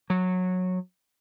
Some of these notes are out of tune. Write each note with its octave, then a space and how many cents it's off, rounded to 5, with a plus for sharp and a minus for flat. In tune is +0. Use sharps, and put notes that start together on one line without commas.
F#3 -15